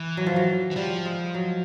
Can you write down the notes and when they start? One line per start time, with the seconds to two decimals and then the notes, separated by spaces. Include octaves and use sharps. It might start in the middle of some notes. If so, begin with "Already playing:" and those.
Already playing: E3
0.17 F#3
0.26 F3
0.36 F#3
0.71 E3
0.76 F3 G3
1.06 G#3
1.34 F#3